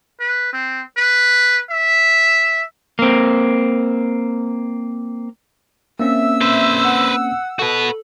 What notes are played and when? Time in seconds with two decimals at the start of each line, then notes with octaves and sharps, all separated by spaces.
0.20 B4
0.53 C4
0.97 B4
1.70 E5
2.99 A#3 C4
6.00 A#3 C4 C#4 E5 E6
6.41 B4 C5
6.84 F#5
7.59 F#4 A4 B4